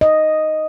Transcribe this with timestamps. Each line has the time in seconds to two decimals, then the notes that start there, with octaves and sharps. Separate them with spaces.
0.01 D#5